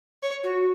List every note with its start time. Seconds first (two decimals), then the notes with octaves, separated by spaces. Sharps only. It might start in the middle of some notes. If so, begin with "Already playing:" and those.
0.23 C#5
0.44 F#4